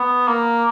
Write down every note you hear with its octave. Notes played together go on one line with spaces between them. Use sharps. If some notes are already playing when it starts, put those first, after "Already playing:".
Already playing: B3
A#3